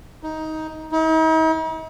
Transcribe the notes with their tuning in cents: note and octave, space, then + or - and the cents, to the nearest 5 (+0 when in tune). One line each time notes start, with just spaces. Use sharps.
D#4 +15
D#4 +45